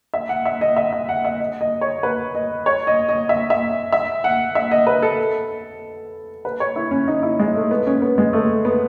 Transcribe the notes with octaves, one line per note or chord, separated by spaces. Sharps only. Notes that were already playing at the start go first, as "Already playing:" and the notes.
E5
F#5
E5
D#5
E5
E5
F#5
E5
D#5
D#5
C#5
B4
D#5
C#5
D#5
D#5
E5
E5
E5
F#5
E5
D#5
B4
A4
B4
C#5
E4
C#4
D#4
E4
G#3
A3
B3
C#4
B3
G#3
A3
B3